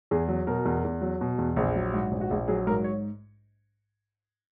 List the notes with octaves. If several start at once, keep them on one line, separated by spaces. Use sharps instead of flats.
E2 G#4
F#3
B2 A#4
E2
E2
F#3
B2
E2
A#1 G#4
F#3
G#2 F#4
A#1
F#4
A#1 G#4
F#3 G#4
G#2 A#4
C#5